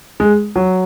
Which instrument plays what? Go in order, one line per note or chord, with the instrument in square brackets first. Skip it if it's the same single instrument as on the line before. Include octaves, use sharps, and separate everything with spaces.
[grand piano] G#3
F#3